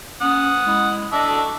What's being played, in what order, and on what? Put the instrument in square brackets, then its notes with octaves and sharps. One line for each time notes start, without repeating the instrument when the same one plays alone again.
[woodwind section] C#4 [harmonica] F#5 D#6
[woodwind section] G#3 E4
[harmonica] D4 E5 [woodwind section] D#5
[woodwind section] F#4 A4